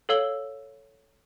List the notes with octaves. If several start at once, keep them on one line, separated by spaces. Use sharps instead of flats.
A4 C#5 F5 E6 F#7 G7